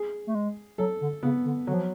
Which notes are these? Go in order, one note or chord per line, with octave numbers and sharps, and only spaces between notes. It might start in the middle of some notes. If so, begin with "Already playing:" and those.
Already playing: G#4
A3
G#3
F#3 A4
D3
C#3 B3
D3
D3 F#3
F3